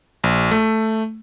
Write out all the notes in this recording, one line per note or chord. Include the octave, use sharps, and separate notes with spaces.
A#1
A3